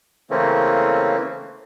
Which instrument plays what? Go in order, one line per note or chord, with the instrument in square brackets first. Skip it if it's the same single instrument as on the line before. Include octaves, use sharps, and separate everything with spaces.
[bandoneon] C#3 E3 A3 A#3 C4 C#4